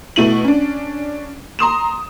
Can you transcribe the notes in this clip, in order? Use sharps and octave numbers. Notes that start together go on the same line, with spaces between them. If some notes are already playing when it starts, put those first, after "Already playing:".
B2 A3 E4 D#7 F#7
C#4 D4
A#5 C6 D#6 E7